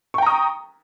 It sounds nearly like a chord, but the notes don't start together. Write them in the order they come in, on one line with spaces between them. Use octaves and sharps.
C#6 G5 A#5 D#6